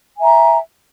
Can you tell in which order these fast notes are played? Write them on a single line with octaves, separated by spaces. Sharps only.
G#5 E5 A#5